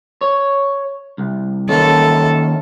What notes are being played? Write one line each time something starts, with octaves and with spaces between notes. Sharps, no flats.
C#5
C2
D#3 A#3 C#4 A4